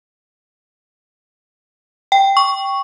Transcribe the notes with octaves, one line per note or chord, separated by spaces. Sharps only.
G5
C#6